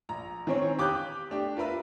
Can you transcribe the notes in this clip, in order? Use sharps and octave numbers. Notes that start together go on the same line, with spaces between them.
A#1 A#5
D#3 E3 C4 C#4 C#5
G4 D6 D#6 F#6 G6
A3 D4 G4
F4 A#4 B4 E5